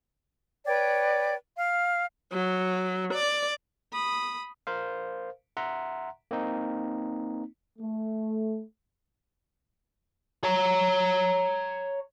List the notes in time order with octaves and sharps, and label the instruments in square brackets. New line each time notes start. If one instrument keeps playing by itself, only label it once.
[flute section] B4 C#5 D5 G5
F5 F6
[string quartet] F#3
D5
[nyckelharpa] B5 D#6
[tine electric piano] A#4 C5 F5
E5 F#5 A#5 C6
A#3 C4 D#4
[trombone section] A3
[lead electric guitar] C#5 A#5